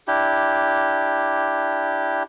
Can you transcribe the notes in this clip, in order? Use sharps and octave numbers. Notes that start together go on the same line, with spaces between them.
D4 E4 G4